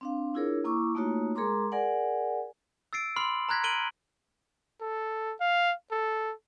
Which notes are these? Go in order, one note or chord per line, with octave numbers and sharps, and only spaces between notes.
C4 D4 F5
D4 E4 F4 G#4 A#4 C#5
A#3 E4 C#6 D6
A3 A#3 D#4 F4 F#4 C#5
G#3 G#4 A#4 A#5 C6 D6
G#4 A#4 D5 F#5 G#5
E6 A6 C7 D7
B5 C6 D6 F6 C7 F#7
A#5 F6 F#6 G#6 A#6 B6
F6 D7 D#7 F#7 G7
A4
F5
A4